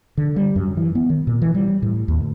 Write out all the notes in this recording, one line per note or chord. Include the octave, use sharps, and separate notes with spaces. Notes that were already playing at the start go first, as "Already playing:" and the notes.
D3
G3
F#2
E3
B3
D#3
A#2
E3
G3
A2
D#2
D2